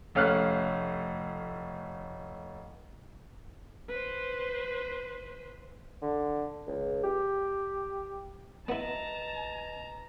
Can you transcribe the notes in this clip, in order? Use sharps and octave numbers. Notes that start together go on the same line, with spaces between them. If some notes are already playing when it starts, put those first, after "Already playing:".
F1 A3 C#4 F5 F6 F#6
B4 C5
D3
C#2
G4
B3 E4 B4 D#5 A5 A#5